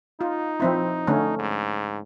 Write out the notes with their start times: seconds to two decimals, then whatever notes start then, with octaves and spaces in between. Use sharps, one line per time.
0.21 D#4 F4
0.60 F3 C4 E4
1.07 D3 A3 C#4
1.39 G#2